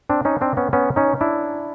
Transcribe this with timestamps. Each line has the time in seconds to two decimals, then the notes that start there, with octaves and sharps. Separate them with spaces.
0.10 C4 D4
0.25 C#4 D#4
0.41 C4 D4
0.57 B3 C#4
0.73 B3 C#4
0.96 C#4 D#4
1.21 D4 E4